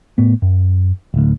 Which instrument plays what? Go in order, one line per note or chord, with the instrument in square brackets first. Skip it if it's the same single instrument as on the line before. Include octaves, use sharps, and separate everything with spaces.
[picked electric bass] A2 B3
F#2
D1 D2